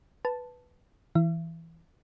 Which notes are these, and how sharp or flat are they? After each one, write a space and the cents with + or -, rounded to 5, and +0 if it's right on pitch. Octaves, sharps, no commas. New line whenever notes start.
B4 +0 A5 +0
E3 +0 E5 +40